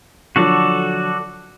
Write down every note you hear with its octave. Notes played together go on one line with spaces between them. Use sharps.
D3 F3 F#3 F#4 A4 D5